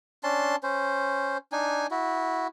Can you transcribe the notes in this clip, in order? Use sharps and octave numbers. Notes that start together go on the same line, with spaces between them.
C#4 D4 A5 C6
C#4 C5
D4 D#4 G#5
E4 F#4